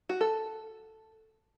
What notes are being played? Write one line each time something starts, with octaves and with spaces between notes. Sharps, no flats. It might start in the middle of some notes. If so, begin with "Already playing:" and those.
F#4
A4